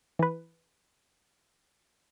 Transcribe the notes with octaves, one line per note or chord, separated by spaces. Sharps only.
E3 B4